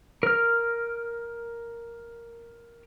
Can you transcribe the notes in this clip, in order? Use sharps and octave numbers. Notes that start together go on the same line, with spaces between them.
A#4 F6